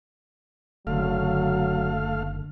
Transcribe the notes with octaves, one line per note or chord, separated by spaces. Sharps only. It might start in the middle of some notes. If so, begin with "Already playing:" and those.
F#1 D3 F#3 A3 F5